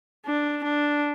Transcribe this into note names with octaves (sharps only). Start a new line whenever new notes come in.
D4
D4